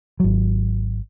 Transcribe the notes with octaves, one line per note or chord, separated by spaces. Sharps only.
G#1 F#3